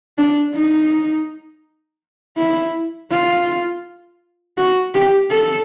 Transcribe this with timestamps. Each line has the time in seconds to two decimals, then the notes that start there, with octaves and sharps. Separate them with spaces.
0.18 D4
0.55 D#4
2.38 E4
3.11 F4
4.57 F#4
4.95 G4
5.31 A4